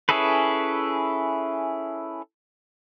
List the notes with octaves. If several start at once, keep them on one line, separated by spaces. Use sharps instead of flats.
C#4 E4 G#4 A4 B4